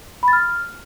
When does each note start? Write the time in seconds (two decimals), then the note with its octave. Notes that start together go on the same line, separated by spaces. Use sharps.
0.23 B5
0.28 A6
0.33 F6